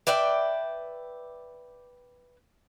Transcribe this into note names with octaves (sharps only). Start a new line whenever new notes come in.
B4 D5 E5 G5